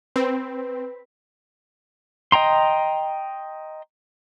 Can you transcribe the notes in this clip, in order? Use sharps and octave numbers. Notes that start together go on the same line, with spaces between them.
C4 B4
D#5 G5 A#5 C6